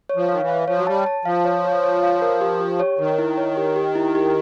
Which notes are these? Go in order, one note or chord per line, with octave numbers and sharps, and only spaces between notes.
C#5
F3
D#3 F5
E3
F5
F3 C#5
F#3
G3 A5
A5
F3 F5
C#5
C#5
C#5
F5
A#4
G4
G4
C#5
D#3 A#4
E4
C#5
G4
G4
E4
G4